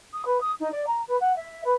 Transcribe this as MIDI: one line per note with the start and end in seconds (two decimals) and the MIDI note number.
0.12 0.22 87
0.25 0.38 71
0.40 0.52 87
0.59 0.70 63
0.71 0.83 74
0.86 1.01 82
1.07 1.16 71
1.20 1.35 78
1.36 1.62 76
1.64 1.73 71